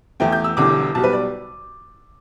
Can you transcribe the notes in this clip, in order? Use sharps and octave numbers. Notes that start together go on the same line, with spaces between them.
E2 E3 A3 G5
G6
E6
E1 E2 D3 G3 D6
B1 B2 G3 A5
B4
D5